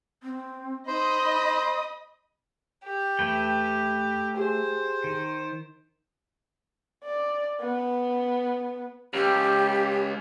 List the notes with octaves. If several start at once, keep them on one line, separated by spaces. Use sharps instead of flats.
C4
D#4 C5 D#5 B5 D#6
G4
E2 A3 B4 G5
G4 G#4 C5
D#3
D5
B3
C#2 G4